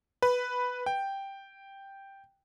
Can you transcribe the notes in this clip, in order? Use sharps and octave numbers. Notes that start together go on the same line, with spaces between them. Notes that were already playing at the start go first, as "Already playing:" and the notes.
B4
G5